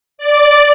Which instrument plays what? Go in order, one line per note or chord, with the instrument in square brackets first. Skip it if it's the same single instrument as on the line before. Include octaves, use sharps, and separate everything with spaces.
[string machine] D5